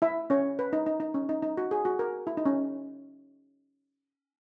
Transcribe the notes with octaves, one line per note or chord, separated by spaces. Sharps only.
E4 E5
C#4 C#5
B4
D#4
D#4
D#4
C#4
D#4
D#4
F#4
G#4
F#4
A#4
E4
D#4
C#4